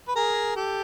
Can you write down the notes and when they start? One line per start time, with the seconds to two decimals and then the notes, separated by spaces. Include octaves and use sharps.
0.08 B4
0.16 G#4 A#4
0.56 G4 A4